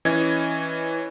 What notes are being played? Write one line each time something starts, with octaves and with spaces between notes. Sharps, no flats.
E3 C#4 D#5 G#6